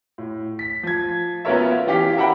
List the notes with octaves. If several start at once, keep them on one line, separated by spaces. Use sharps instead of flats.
A2
B6
F3 G#6
B3 C#4 F4 A#4 C#5 E5
E3 C#4 G4 F5 D6 B6
A#4 E5 F#5 G5 B5